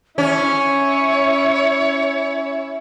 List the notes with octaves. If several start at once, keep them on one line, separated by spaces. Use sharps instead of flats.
C#4 E4 C#5